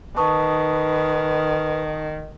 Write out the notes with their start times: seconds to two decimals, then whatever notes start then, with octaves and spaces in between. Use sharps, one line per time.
0.17 D#3 B4 A5 C#6 D#6